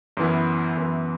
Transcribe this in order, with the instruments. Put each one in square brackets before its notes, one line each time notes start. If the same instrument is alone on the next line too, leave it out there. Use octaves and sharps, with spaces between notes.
[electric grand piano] F#2 E3 B3 E4
F#2 E3 B3 E4